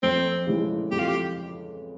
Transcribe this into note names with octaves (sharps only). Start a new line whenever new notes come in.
F2 C4
C#3 E3 G#3
F2 G4
F4
G4